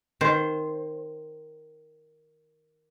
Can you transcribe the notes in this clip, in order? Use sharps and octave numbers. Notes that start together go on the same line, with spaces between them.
D#3 C5